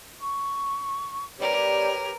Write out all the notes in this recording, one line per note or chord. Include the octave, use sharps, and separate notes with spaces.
C#6
G3 B3 D4 G4 A#4 B4 C#5